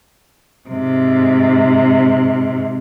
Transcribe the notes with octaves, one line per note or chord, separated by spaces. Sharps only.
G#2 C3